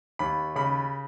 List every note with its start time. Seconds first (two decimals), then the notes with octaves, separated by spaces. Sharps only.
0.19 D#2 B5
0.55 C#3 B5